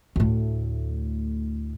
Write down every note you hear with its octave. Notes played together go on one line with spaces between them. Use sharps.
D2 A2